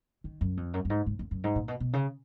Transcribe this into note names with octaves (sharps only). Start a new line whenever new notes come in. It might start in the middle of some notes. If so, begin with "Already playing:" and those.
D#3
F#2
F2
F#2
F#2
G#2
G#2
F2
F#2
G#2
A#2
B2
B2
C#3